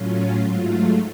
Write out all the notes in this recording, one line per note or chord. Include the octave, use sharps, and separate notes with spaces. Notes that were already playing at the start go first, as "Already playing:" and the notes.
Already playing: A2 F#3 C#4 F4
G#2 F#3 A3 F4